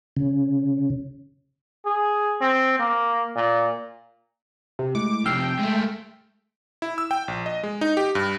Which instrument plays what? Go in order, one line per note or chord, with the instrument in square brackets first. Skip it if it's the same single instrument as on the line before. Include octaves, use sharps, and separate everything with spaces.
[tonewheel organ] C#3
[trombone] G#4
C4
A#3
A#2
[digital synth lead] C3
[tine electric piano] G#3 A3 E4 [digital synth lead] D6
[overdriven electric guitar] F2 C3 [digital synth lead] G5 [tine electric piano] E6 F6 C7
[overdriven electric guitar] G#3 A3
[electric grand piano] E4
E6
G5
A#1
D#5
G#3
D#4
G4
G2